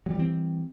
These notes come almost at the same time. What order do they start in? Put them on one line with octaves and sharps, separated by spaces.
F#3 G3 E3 C4